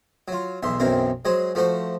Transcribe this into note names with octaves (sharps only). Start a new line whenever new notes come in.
F#3 F4
B1 E2 E5 C6
B1 F#2 E3 C4 A#4
F#3 G#3 G#4 C5
F3 A3 F#4 C5